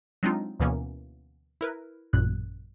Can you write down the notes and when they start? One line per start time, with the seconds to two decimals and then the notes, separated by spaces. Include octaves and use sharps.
0.23 F#3 G#3 C4 D4 D#4 F4
0.60 D2 B2 E3 A#3 B3 C#4
1.61 E4 A#4 B4
2.13 A1 F#2 A#2 F#6